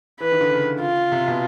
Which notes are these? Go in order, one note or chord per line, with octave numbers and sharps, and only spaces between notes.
E3 B4
D#3
D3
C#3
F4
C3
B2